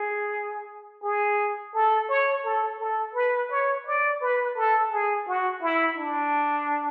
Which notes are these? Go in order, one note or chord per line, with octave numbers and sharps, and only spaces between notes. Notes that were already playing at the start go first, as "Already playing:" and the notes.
Already playing: G#4
G#4
A4
C#5
A4
A4
B4
C#5
D5
B4
A4
G#4
F#4
E4
D4